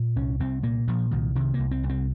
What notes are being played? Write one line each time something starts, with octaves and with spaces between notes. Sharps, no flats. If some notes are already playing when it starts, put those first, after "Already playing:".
Already playing: A#2
C2 C#4
C2 C4
A#2 A#3
A#2 F3
C2 D#3
C3 D#3
A#3
C2
C4
C2
C4